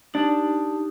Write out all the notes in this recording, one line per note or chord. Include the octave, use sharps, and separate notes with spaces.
D4 D#4 G4